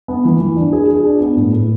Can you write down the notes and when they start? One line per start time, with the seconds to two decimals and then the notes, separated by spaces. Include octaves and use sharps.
0.08 B3
0.25 E3
0.41 E3
0.56 D4
0.73 G#4
0.89 G#4
1.04 D4
1.21 B3
1.37 A2
1.53 A2